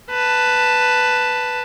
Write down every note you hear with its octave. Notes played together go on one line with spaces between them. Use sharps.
B4 A5